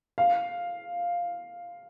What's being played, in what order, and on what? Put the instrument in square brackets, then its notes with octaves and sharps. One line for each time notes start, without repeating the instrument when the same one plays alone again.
[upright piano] F5